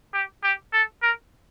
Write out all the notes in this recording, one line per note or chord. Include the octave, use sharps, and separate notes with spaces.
G4
G4
A4
A#4